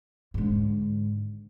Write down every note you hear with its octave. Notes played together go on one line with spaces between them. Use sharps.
G#2 D3